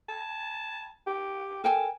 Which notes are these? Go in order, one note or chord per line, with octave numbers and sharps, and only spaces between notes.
A5
G4
A4 A#4 G5 G#5